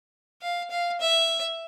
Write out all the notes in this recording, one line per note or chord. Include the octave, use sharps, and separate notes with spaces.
F5
F5
E5